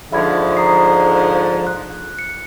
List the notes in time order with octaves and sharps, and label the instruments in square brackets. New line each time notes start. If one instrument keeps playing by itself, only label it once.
[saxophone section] G#2 D3 F3 [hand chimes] E5 B5 G#6
[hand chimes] A#5 D#6 C7
F#6
C#7